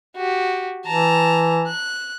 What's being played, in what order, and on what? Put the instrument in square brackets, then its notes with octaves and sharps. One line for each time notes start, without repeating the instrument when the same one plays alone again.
[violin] F#4 G4
[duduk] E3 [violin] A5 A#5
[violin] F#6